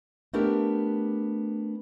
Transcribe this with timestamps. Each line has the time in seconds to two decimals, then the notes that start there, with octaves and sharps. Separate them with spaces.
0.33 A3 B3 D4 G4 A#4